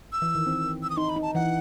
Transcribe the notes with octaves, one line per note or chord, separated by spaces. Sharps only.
E6
E3
D#3
C4
E6
D#6
D#4 C6
B5
D#4
A5
E3 F#5